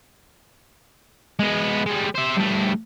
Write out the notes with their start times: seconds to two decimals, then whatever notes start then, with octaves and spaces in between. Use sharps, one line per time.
1.39 G#3 B3
1.86 G3 G#3
2.15 C5 E5
2.37 G2 A3